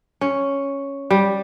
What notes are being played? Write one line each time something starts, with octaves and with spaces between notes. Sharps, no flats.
C#4
G3